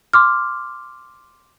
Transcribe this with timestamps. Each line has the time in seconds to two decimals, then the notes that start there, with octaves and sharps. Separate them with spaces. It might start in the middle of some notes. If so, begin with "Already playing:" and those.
0.13 C6 D6 F6